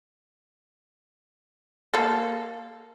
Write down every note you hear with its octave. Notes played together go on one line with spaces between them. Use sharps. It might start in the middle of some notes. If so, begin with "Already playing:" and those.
A#3 A4